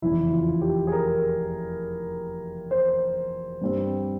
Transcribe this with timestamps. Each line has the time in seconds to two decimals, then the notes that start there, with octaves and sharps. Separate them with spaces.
0.02 F1 E2 C#3 E4
0.32 F4
0.62 G4
0.87 G#4
0.92 A#4
2.71 C5
3.61 G2 G3 C4